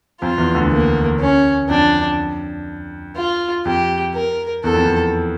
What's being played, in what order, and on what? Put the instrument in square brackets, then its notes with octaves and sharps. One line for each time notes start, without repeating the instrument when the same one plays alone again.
[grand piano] F2 F3 [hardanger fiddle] F4
[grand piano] E2 E3
D2 D3
[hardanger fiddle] A#3
C#4
[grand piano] F2 [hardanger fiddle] D4
[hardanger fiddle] F4
[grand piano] F2 [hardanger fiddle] G4
[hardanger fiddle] A#4
[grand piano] E2 [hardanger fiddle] A4
[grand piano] F2
E2